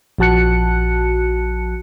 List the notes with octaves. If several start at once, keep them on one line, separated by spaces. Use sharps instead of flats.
A#1 F3 F#4 A5 F#6 C#7